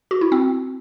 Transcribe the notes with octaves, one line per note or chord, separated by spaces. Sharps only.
F#4
E4
C4